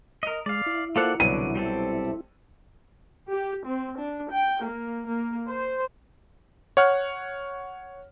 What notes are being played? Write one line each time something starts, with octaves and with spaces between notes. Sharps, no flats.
A#4 D#5
G#3 D5 F5
E4
A#3 F4 A4 C5 D5 F#5
C2 B2 D3 F#3 D#7
G3 C4 A4
G4
C4
D4
G5
A#3
A#3
C5
C#5 F#5 F6